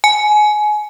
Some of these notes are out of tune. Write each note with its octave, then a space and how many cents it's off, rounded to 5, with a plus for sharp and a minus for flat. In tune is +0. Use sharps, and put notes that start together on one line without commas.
G#5 +25